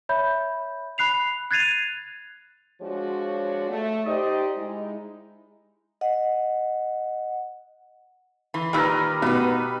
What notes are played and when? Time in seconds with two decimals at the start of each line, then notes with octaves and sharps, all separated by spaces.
0.09 C#5 E5 B5 G6
0.98 B5 F#6 C7 F7
1.51 F#6 G#6 A6 C7 D#7 F7
2.81 F3 G#3 D4 F#4 C#5
3.70 A3
4.06 D#4 G4 C5 D5 D#5
4.57 G#3 D#4 E4
6.01 D#5 F#5
8.54 E3 C6
8.73 A#2 D#3 G3 B4 A#5 B5 E6 F6
9.22 B2 B3 D#4 B4